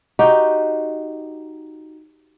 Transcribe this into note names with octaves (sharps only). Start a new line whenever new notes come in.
D#4 F#4 G4